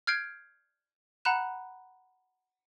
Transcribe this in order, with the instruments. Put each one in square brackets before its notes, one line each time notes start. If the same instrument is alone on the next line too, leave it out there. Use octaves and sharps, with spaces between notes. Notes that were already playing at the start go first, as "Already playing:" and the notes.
[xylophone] F6 G6 G#6 C7 D7
F#5 A#5 B5 F#6 E7